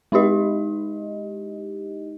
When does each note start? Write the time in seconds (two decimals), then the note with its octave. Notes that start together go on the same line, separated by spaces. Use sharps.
0.12 G#3 D#4 E4 G4 D#5